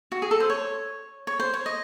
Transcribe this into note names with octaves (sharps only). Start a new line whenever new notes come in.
F#4
G#4
A4
C5
C#5
C#5
C5
C#5
D#5